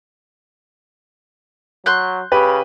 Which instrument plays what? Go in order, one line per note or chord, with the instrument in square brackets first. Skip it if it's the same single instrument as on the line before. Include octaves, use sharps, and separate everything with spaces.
[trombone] F#3 [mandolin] C6 F#6 G6
[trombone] C#3 [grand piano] G4 B4